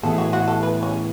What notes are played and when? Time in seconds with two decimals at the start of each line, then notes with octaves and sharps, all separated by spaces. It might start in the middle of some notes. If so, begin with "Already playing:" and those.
0.03 A2 E3 B3 E4 G#4 A4
0.18 F#4
0.33 F#4
0.48 A4
0.63 B4
0.83 C#4